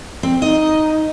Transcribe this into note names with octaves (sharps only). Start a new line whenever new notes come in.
C4
D#4 D#5